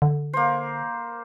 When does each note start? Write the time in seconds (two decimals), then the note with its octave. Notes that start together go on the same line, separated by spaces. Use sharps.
0.02 D3
0.33 A#3 C5